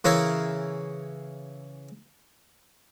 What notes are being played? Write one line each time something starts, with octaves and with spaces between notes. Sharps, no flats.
C#3 E3 C#4 E4 A#4